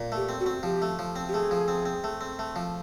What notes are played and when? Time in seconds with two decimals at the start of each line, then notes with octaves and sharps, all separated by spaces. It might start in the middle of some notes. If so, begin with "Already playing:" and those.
Already playing: A#2
0.12 A3 G4
0.29 C4
0.40 F#4
0.46 C4
0.63 F3 G4
0.82 A3
0.99 F3
1.16 C4
1.28 G4
1.33 A3 G#4
1.51 F3
1.68 C4
1.85 C4
2.04 A3
2.21 C4
2.39 A3
2.56 F3